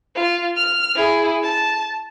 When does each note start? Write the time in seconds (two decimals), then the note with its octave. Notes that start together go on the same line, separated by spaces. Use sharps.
0.16 F4
0.56 F6
0.95 E4 G#4
1.43 A5